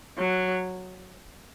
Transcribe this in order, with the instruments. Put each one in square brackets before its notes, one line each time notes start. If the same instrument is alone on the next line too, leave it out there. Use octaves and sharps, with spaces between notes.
[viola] F#3